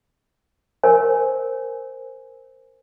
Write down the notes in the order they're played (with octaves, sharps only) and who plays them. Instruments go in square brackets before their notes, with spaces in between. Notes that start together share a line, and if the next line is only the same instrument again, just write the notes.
[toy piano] A#4 C5 G#5